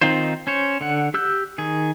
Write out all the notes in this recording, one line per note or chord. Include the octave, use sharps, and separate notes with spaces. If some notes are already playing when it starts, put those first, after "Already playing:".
D#3 C4 D#4 F4 C5
C#4 C5 C#5
D3 F#5
G4 E6 F#6 G6
D#3 G#4